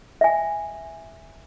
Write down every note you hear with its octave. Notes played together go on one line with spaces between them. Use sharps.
E5 G#5